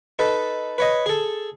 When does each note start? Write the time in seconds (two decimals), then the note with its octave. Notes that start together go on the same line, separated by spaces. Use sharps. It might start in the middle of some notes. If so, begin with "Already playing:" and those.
0.19 D#4 A4 B4
0.78 B4 C#5 D#5
1.06 G#4 A4